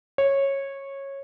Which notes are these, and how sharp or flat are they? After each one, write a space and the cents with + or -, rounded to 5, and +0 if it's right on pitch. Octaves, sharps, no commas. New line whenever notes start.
C#5 -15